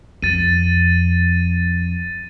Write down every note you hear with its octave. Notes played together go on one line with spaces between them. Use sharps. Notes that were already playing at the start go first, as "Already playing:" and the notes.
F2 A6 D#7